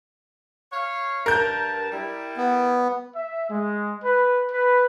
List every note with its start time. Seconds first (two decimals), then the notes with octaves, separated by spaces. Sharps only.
0.73 C#5 F5
1.26 G2 A#4 A5 G6
1.92 G3 E4
2.37 B3
3.16 E5
3.50 G#3
4.04 B4
4.52 B4